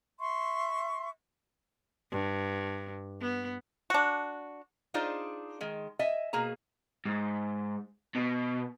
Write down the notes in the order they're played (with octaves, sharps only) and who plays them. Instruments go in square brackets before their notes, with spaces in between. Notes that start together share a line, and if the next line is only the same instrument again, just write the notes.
[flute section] E5 C6 C#6
[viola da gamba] G2
B3
[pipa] D4 F#4
[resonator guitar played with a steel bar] D4 D#4 F4 G#4 C5 D5
D#3 G#3
D#5 E5 G#5
B2 A#3 G#4 A#5
[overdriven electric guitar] G#2
B2